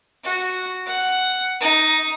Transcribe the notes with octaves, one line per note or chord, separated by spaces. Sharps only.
F#4
F#5
D#4